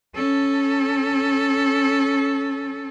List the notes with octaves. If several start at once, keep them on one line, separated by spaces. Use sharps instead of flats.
C#4 A4